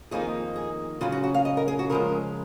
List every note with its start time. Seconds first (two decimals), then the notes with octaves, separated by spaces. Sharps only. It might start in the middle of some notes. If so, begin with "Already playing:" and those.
0.11 F2 D#3 A#3 D#4 G#4
0.56 G#4
1.01 C#3 F#3 C#4 F4
1.12 F#4
1.24 F#4
1.34 F5
1.45 D#5
1.57 A#4
1.68 G#4
1.79 F#4
1.90 C#3 F3 G#3 A#4